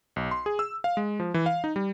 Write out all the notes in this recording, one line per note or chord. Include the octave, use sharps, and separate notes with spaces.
B1
C6
G#4
E6
F5
G#3
F3
E3
F5
D#4
G3